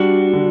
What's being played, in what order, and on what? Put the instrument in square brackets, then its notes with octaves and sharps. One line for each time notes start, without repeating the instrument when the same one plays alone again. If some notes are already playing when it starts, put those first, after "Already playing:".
Already playing: [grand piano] G3 [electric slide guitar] D4 F#4
[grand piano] D3